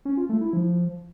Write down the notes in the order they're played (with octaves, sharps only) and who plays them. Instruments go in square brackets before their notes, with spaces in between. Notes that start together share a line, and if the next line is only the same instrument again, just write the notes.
[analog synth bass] C#4
F4
A3
E4
F3